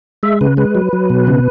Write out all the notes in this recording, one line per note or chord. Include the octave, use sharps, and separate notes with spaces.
G#3 E5
C#3 B4
G#3 B4
F#3
F#3
B2
C#3